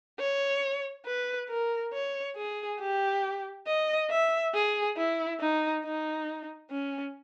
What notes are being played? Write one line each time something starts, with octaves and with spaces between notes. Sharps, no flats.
C#5
B4
A#4
C#5
G#4
G4
D#5
E5
G#4
E4
D#4
D#4
C#4